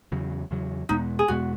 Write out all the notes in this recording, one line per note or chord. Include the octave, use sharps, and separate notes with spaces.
E2 C#3 F#3
E2 C#3 F#3
E2 B2 G#3 B3 D#4
G#4
E2 B2 G#3 B3 F#4